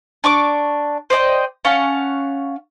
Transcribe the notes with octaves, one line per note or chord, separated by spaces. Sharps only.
D4 C#6 D6
C5 D5 D#5 G5
C#4 F5 F#5 A5